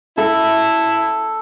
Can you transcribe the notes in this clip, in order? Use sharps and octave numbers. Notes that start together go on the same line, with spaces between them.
E4 A4